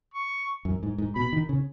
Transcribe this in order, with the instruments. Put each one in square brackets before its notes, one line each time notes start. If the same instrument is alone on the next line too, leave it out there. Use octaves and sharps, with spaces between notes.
[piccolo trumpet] C#6
[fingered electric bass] F#2
G#2
G#2
[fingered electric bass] B2 [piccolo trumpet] B5
[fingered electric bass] D#3
C#3